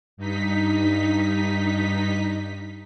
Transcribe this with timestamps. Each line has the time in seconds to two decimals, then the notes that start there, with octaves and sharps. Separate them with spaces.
0.17 G2 D#4 B6